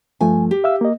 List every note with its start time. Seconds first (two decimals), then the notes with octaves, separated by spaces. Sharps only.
0.21 G2 F3 A3 G#5
0.51 G4
0.64 E5 F5 E6
0.81 A#3 D#5